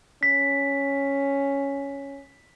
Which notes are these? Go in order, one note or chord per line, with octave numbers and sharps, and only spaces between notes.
C#4 B6